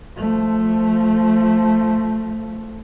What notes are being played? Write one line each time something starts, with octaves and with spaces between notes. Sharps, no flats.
F3 A3